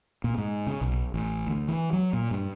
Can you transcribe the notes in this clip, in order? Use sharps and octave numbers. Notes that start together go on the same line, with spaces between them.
A#2
G#2
C#3
B1
A1
D2
E3
F#3
A#2
G2